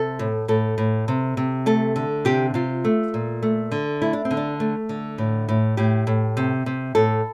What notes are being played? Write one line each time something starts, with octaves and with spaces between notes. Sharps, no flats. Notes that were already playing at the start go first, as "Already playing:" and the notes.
Already playing: C3 A4
A2
A2 A4
A2
C3
C3
A3 A4
D3
C3 G4
C3 F4
A3
A#2
A3
D3
A3 E4
D4
C4
D3
D4
A3
D3
A2
A2
A2 G4
A2
C3
C3
A2 A4